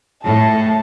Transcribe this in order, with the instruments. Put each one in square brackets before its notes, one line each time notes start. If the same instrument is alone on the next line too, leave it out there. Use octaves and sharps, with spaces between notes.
[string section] A2 [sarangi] A5